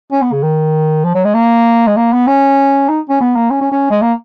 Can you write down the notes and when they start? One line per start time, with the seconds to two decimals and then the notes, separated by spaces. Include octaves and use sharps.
0.12 C#4
0.22 B3
0.32 C#3
0.43 D#3
1.04 F3
1.15 F#3
1.25 G#3
1.34 A#3
1.87 G#3
1.97 A#3
2.13 B3
2.27 C#4
2.89 D#4
3.09 C#4
3.21 B3
3.36 A#3
3.50 C#4
3.61 C#4
3.72 C#4
3.91 G#3
4.02 A#3